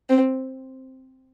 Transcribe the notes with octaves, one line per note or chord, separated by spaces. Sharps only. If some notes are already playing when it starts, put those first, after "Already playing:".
C4